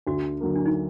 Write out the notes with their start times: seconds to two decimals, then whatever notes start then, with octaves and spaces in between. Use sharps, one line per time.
0.07 D2 F#4
0.40 D3 F#3 A#3
0.55 D4
0.65 D#4